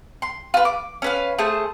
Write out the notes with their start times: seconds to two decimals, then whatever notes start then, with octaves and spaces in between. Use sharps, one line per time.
0.22 C6
0.54 F4 B4
0.65 D6
1.02 C#4 B4 F5
1.38 A3 G#4 C5 A5